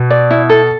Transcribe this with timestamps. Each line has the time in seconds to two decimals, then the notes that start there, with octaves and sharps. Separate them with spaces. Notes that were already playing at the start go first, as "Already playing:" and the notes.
Already playing: B2
0.10 D5
0.31 E4
0.49 A4